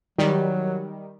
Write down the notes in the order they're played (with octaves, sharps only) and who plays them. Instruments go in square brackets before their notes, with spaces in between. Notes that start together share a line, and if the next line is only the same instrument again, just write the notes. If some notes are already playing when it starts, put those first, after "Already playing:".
[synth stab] D#3 G3 [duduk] F#3